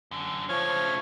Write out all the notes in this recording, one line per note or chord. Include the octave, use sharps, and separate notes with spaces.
F#2 D3
C#3 F3 A3 C#5 F6